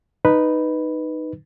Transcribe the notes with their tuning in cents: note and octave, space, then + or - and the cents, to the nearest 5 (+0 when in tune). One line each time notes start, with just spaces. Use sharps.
D#4 -5 B4 +0